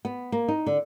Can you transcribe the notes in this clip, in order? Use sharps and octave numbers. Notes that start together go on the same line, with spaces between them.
B3
A#3
D#4
D3